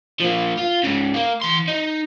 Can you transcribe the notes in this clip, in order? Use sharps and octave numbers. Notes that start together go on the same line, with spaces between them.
F3 A#3
F4
G#2 C#3
A#3
E3 C6
D#4 D#5